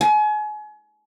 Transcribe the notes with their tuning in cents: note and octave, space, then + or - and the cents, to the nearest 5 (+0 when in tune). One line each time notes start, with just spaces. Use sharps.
G#5 +35